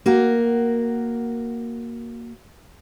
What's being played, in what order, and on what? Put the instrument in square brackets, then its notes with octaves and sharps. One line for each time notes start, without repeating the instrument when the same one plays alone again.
[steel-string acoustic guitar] A#3 F#4 A#4